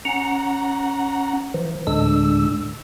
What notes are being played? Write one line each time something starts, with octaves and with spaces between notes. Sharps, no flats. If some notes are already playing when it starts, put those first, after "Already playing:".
C#4 F#5 A#5
E3 F3
D2 A2 D3 G#3 D4 E6